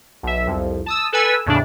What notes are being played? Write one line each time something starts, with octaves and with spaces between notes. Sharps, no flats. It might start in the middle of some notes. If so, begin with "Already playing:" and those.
B1 E5
C2 F2
A5 D#6 E6
A4 B4 G#5 E6
E2 A2 C#3 D4